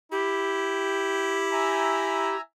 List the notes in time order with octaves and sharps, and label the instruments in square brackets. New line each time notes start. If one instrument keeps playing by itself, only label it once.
[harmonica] E4 [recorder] G4
[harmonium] E5 G#5 A#5